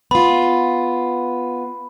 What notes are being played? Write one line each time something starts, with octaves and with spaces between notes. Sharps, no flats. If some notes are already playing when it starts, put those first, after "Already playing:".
B3 F4 B5